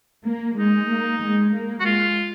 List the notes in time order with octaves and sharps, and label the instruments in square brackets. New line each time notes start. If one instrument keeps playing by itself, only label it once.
[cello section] A#3
[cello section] G#3 [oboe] D#4
[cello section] A#3
G#3
A#3
[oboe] F#4
[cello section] G#3 [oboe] F4